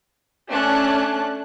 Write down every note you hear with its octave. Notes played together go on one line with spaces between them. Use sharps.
A3 C#4 D4 A5 F#6